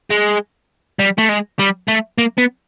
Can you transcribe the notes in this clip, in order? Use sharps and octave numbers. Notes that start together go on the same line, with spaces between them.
G#3
G3
A3
G#3
G3
A3
A#3
B3